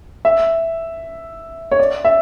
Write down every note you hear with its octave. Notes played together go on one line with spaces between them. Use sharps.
E5
C#5
D5
E5